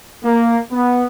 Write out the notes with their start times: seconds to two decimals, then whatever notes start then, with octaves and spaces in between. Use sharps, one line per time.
0.24 A#3
0.72 B3